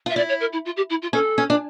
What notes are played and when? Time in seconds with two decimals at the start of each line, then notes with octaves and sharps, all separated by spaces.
0.06 F4 E5
0.16 E4 D5
0.29 C#5
0.40 A#4
0.53 E4
0.65 F4
0.77 G4
0.90 E4
1.02 F4
1.13 C#4 A4
1.38 C#4
1.50 D4